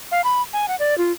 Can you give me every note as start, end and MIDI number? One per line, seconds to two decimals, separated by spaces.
0.12 0.24 77
0.24 0.42 83
0.53 0.66 80
0.68 0.75 78
0.79 0.97 74
0.98 1.12 65